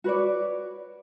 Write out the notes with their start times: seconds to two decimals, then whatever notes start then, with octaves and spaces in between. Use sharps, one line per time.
0.04 F#4 B4 C#5 D5